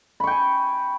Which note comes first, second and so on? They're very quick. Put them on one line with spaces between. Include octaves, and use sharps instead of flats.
B5 C#6 G5 G#5